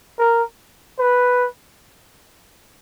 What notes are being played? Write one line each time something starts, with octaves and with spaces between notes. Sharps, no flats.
A#4
B4